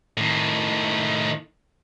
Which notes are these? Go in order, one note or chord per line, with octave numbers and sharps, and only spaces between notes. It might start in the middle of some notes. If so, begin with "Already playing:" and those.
A2 D#3